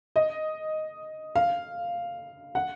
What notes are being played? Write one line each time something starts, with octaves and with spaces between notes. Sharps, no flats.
D#5
F5
F#5